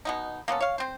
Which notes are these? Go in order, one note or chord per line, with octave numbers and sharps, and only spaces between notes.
B2 B3 D#4
A#3 B3 C#4 A4
C#5 F5
C4 C5